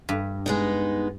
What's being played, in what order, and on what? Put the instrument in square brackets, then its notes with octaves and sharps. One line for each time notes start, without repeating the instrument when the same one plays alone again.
[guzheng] G2
[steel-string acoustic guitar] G#3 B3 D#4